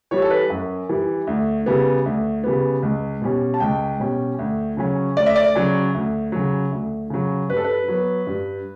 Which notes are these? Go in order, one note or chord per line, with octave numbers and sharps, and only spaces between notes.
E3 G3 C#5
A4
B4
F#2
E3 G3
D2
C#3 G3 B3
D2
C#3 G3 B3
C#2
B2 G3 C#4
A5
C#2 G5
B2 G3 C#4
D2
C#3 F#3 C#4
D2 D5
E5
D5
C#3 F#3 C#4
D2
C#3 F#3
D2
C#3 F#3
G2 B4
A4
B4
F#3 B3
G2